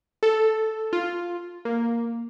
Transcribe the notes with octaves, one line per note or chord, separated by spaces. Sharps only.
A4
F4
A#3